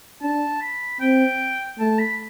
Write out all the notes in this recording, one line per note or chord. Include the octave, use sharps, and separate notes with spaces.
D4 A5
B5
C4 G5
A3 A5
B5